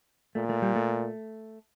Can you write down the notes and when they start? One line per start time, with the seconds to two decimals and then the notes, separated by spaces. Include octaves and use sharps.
0.35 A#2 A3
0.49 A3
0.62 G3
0.76 A3